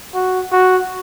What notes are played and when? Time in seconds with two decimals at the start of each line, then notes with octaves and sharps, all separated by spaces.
0.14 F#4
0.52 F#4